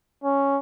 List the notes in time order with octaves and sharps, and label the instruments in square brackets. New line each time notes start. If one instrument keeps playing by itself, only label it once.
[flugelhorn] C#4